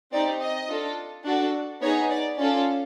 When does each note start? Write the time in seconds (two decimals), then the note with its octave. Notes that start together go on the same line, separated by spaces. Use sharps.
0.12 C4 D#4 G4 D5
0.40 D#5
0.69 D4 F4 A4
1.24 D4 F#4 A4 D5
1.81 B3 D#4 G#4 C#5
2.10 D5
2.37 C#4 F4 A4 D5